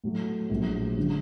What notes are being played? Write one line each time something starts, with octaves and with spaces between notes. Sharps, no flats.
A2 F#3 A3
A#1 A2 F#3
D3 F#3